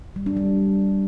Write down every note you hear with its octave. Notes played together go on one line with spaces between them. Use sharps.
G3
D4
G3